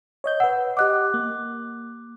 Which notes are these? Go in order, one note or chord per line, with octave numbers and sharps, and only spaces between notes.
C#5 D#5 G6
B4 F#5 E6
G4 D#5 F#5 D6 F#6
A#3